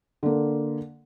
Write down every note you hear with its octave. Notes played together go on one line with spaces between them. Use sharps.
D3 A#3